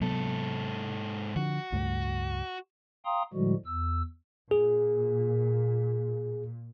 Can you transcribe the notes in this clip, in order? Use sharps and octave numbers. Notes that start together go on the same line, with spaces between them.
G#2 C3 F#3 B3 A4
D3 F3 F#4
C#2 G2 A3
F5 G5 A#5 C6 D#6
A2 D3 F3 G3 G#3 F#4
E2 E6
A#2 G#4